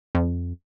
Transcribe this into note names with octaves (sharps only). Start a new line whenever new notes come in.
F2